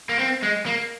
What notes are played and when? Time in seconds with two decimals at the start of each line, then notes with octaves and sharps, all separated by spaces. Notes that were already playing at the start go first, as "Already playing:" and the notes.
0.09 A#3
0.19 C4
0.42 G#3
0.66 A#3